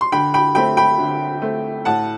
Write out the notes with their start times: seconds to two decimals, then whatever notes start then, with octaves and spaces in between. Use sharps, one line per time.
0.01 C6
0.12 D3 G5 B5
0.34 G5 B5
0.55 A3 C4 G5 B5
0.77 G5 B5
0.99 D3
1.42 A3 C4
1.85 A2 F#5 A5